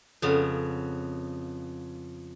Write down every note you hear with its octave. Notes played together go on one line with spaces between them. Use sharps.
F2 C#3 B3